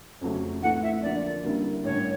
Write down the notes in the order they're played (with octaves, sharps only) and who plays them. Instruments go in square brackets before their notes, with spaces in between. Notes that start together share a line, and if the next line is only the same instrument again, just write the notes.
[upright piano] F2 C#3 F#3 A3
[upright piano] A2 E3 A3 C4 [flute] F#5
[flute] E5
[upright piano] D3 F3 A#3 D4 [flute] D5
[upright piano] D3 G3 A#3 C#4 E4
[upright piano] A1 G2 D3 [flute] C#5